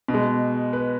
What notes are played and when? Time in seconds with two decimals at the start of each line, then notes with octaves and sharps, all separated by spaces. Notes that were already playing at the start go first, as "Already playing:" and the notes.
0.08 B2
0.14 G#3
0.73 B4